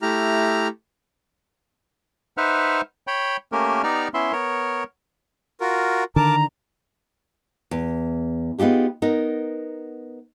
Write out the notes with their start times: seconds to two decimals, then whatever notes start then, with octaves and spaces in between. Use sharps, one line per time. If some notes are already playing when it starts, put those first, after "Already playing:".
0.02 A3 E4 G4 A#5 F6
2.37 D#4 B4 C5 E5 F#5 F6
3.07 C#5 G5 B5
3.52 A3 A#3 C#4 G4 A#4
3.83 B3 D#4 G4 D5 A#5 F6
4.14 B3 C#4 E4 E5 C6
4.32 B3 A#4 C#5
5.61 F4 F#4 A#4
6.16 D3 D#3 D4 A#4 A5 A#5 D6
7.71 E2
8.59 B3 D#4 F4 G4 G#4
9.02 B3 D#4 A#4